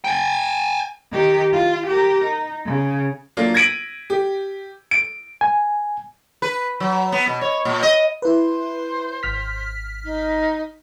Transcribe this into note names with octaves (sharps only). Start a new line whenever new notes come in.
G5 G#5
D#3 G4
F4
G4 A#4
D#4
C#3
F#3 A#3 D4 F4
G#6 A#6 B6 D7 D#7 F#7
G4
D7
G#5
B4
F#3
B3
B2
C#5
A#2
D#5
E4 B4 C5
G#1 F6 B6
D#4